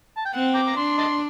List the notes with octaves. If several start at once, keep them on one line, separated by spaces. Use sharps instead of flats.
A5
G5
C4 F#5
G5 A#5 D6
A#5
D4 C6
D#5 A5 C6